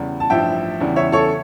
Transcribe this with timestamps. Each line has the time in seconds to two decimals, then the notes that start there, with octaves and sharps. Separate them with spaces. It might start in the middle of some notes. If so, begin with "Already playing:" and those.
Already playing: E2 C#3 G3
0.20 A5
0.30 A1 G2 F3 E5 G5
0.80 E2 C#3 E3 G3
0.96 C#5 E5
1.12 A4 C#5